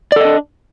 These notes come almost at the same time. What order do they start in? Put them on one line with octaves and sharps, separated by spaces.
D5 A4 D#5 D4